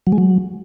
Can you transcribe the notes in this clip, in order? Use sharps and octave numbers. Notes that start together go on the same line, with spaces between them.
F#3
G#3
F#3